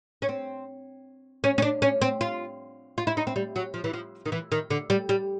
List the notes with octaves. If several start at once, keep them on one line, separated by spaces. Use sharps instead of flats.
C#4
C4
C#4
C#4
D4
C#4
C4
F4
F4
E4
D#4
C4
G3
F#3
F3
E3
F3
D#3
E3
D#3
D3
G3
G3